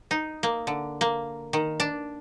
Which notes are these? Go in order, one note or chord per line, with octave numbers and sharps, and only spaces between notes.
D#4
A#3
D3
A#3
D#3
D4